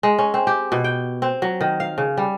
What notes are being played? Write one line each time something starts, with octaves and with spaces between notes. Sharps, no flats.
G#3
C#4
C4
G4
B2
G5
C4
F#3
D#3
F5
C#3
G3